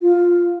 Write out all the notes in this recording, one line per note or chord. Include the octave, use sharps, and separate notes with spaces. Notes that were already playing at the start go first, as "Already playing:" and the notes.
F4